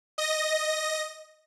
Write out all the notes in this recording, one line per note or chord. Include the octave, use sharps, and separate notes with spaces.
D#5 A#6